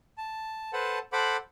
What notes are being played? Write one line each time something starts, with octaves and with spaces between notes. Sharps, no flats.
A5
A4 B4 C5 F#5 A5
A4 C5 F#5 B5 D6